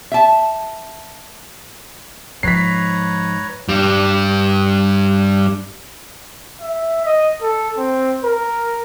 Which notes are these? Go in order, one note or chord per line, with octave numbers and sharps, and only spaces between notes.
E5 A5
G#2 D#3 F3 B4 C#5 A#5 B6 C7
G2 G3
E5
D#5
A4
C4
A#4